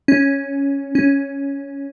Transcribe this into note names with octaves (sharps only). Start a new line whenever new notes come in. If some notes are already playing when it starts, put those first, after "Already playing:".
C#4
C#4